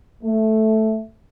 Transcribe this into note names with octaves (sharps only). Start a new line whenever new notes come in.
A3